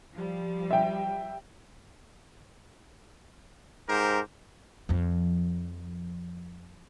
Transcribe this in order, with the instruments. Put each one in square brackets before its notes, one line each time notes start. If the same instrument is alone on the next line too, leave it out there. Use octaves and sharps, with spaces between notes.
[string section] F3 G3
[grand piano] E5 G5
[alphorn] G#2 [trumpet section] G4 A#4 C5
[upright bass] F2 F3